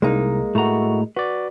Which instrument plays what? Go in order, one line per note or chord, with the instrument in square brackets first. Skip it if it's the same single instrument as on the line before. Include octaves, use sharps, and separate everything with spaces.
[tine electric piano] C2 [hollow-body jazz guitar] G#3 A#3 D#4
[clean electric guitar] A2 A#5 [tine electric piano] A3 F#4
[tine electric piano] F#4 D5 [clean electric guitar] B4